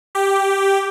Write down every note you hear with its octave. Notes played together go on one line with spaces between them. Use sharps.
G4